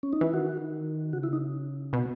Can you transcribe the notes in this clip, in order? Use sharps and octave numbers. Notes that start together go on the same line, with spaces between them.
C#4
D#4
E3 E4
D#3 F#4
C#3 F#4
E4
D#4
B2 B3